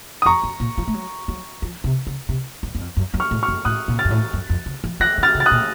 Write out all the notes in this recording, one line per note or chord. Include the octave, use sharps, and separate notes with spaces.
D#6
F2 A#5 C#6
F#2
A#2
F3
A3
F#3
F#3
F3
C3
C#3
C3
F#2
F#2
F2
F#2
F#2
C#6 F6
A2
C#6 F6
F#2
A2 D#6 F#6
A#2
F6 A6
F#2
A2
F#2
F2
C#3
F3
F3 F#6 A#6
D#3
F6 A6
C#3
A6
D#6 F#6
A#2